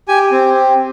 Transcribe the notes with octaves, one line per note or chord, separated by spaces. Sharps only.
G4 G#5
C4
G4